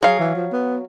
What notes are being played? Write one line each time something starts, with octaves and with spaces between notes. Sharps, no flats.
F#3 G#4 F5
E3
F3
B3